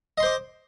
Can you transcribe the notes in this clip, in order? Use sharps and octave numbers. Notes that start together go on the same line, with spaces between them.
C5 D#5 C6 D6